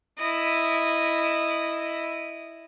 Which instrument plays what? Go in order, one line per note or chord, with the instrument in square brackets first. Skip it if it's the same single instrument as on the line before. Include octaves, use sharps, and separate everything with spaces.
[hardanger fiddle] E4 D#5